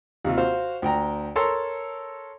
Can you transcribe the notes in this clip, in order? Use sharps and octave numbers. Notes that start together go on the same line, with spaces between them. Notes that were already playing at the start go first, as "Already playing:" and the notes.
D#2 C3 F4
F#4 C5 F5
D2 G5 A#5
A4 A#4 C#5 A5 A#5 C6